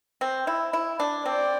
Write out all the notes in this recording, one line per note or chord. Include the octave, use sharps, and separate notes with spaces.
C4
E4
E4
D4
C4 D5